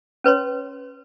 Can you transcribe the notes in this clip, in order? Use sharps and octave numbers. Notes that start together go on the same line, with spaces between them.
C#4 B4 C#5 C6